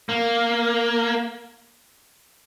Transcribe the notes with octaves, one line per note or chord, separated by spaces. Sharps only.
A#3